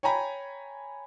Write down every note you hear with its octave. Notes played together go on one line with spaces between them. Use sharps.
C#5 G5 G#5 A#5 B5